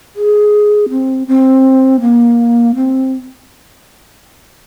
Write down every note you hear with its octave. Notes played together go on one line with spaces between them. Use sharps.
G#4
C4
C4
A#3
C4